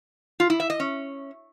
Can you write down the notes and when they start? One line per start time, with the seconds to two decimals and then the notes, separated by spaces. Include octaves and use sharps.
0.40 F4
0.50 E4
0.60 E5
0.70 D#5
0.80 C#4